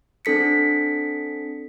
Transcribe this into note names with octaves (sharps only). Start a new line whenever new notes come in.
C4 D4 A4 B6 C#7